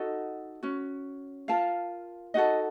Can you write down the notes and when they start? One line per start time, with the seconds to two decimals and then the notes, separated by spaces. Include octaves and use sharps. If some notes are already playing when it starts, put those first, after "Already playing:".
Already playing: D#4 F#4 A4 D#5 F#5
0.63 C#4 F#4
1.48 F4 A#4 F5 A5
2.34 D#4 F#4 A4 D#5 F#5